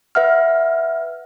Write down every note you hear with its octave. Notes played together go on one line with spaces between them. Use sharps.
B4 E5 F#5 F6